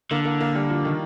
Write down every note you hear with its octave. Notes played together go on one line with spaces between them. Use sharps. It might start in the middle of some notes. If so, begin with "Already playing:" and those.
D3 A#3
A#3
A#3
G3
F3
D#3